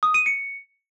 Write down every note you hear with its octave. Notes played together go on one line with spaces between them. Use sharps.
D#6
D#7
C#7